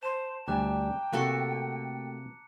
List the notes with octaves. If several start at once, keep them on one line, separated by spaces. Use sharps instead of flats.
C5 A5 E7
D2 G3 G5 G#5 A#5 D6 F#6
C3 A3 A#3 F#4 A4 F#6 C#7